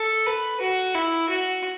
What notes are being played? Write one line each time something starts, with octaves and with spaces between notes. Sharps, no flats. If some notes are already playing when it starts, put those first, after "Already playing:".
Already playing: A4
B4
F#4
E4
F#4